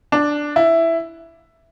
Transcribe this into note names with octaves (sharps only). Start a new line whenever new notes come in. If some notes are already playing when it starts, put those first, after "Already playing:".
D4
E4